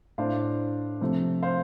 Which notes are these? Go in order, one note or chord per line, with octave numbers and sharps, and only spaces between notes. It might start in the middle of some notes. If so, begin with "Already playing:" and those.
A2 A3 D4 C5 F5
C3 F3 A3
C5 F5